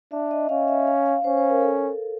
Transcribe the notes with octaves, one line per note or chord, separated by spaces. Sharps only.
D4 E5
D#5
C#4 F5
E5
F5
F5
C#4 C5
C5
A#4
A4